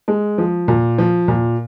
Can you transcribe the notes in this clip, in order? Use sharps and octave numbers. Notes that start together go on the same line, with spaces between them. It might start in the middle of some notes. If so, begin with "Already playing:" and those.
G#3
F3
A#2
F3
A#2